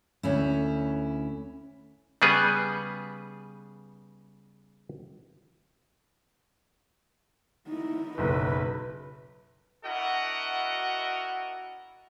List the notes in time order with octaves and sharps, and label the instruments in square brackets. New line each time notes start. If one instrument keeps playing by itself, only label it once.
[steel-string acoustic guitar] D2 C#4 E4
[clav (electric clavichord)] C#3 G3 B3 G#4 B4
[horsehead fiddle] D#4 E4
[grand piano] F#1 B1 [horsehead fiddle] B4
[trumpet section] D4 E4 F#4 A#4 D#5 F#5